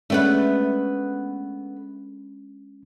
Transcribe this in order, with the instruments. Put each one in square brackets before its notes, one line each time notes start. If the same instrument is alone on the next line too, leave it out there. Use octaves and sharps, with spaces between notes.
[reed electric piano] G#3 C#4 D4 [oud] A3 B3 B4